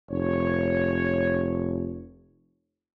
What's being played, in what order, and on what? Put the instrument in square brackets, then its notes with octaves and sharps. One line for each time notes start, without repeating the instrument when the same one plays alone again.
[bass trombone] F1 [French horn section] C#5